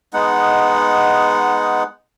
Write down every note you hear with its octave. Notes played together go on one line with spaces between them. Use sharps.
G#3 B3 D#4 F#5